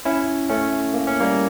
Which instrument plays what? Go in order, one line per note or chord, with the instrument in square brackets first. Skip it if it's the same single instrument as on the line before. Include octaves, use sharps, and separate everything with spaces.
[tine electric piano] C#4 E4
A3 C#4
A#3
C#4
G3 A#3